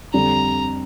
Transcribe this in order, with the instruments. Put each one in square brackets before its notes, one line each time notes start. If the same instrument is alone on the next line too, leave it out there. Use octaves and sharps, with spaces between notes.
[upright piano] F2 D3 G3 [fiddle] A#5